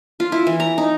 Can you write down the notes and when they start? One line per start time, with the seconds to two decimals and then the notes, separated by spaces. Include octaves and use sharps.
0.20 F4
0.32 E4
0.47 E3
0.60 A#5
0.78 D#4